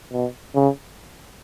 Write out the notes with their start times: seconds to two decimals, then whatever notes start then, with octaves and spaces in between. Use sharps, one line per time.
0.12 B2
0.55 C#3